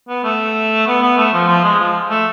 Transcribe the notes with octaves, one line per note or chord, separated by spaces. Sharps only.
B3
A3
B3
B3
A3
F3
F3
G#3
F3
A3